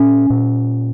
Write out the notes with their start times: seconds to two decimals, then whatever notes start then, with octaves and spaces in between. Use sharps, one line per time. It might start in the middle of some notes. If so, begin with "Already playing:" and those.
Already playing: A#2 C#4
0.30 A#2